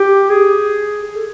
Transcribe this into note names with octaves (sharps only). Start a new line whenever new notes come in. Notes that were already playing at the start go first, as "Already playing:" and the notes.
Already playing: G4
G#4
G#4
A4